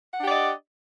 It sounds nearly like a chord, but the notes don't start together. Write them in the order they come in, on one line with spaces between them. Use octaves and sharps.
F#5 D4 G4 D5 D#5